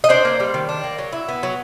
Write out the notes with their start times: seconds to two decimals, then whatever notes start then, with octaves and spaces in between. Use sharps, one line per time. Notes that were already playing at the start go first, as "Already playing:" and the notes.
0.04 D#5
0.09 D4 C5 D5
0.25 A#3
0.40 G3
0.54 D#3
0.69 D4
0.84 A#3
0.98 F#3
1.13 E4
1.29 B3
1.43 F#3